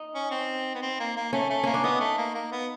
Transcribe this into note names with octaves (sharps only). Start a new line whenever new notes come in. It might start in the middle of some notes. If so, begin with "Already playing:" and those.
Already playing: D#4
C#4
C4
B3
C4
A#3
A#3
A3 C#4
A3
A#3 C#4
D4
B3 D#4
A3
A#3
A#3
B3